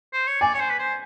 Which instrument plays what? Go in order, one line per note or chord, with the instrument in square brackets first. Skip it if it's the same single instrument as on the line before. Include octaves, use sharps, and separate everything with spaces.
[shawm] C5
C#5
[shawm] D5 [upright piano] G#5
[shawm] C#5
C5
B4
C5